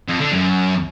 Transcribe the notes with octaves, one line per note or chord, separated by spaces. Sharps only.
F2
D3
F#2